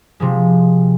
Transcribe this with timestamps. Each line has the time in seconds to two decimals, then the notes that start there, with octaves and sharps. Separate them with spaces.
0.20 C3 F3 G#3